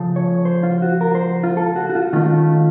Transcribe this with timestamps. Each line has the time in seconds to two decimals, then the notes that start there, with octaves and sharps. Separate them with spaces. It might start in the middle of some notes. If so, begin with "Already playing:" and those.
Already playing: C#3 F3 A3
0.16 C#5
0.45 C5
0.63 F4
0.82 F#4
1.01 A#4
1.15 C5
1.43 F4
1.57 A4
1.76 F#4
1.90 F#4
1.95 F4
2.13 D#3 A3 C#4 F4